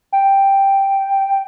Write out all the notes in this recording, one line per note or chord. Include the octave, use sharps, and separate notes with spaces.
G5